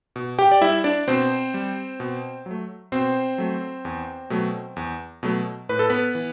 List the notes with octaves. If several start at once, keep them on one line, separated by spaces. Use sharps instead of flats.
B2
G4 G5
D5
G3 E4 E5
D4 D5
B2 C4 C5
G3
B2
F#3 A3
B2 C4 C5
F#3 A3
E2
B2 F#3 A3
E2
B2 F#3 A3
A2 B4
A4
B3 B4
E3